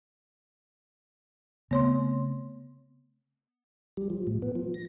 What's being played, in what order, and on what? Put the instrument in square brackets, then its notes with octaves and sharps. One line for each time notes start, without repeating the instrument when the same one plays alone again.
[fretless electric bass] C#3 A3 C4 [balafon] B3 C#5 C6
[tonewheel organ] G3
F3
A2
B3
F3
A#6